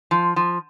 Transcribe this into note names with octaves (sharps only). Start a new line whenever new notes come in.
F3
F3